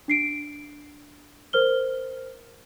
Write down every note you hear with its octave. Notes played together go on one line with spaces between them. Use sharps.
D4 C7 D7
A#4 C5 F6 G7